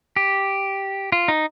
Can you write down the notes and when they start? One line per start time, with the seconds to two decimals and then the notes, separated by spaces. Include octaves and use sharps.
0.16 G4
1.12 F4
1.28 D#4